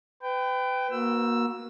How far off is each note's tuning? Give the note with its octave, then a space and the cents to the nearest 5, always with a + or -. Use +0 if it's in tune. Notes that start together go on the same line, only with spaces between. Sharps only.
B4 +35 G5 +0
A#3 +20 F#4 -20 E6 +5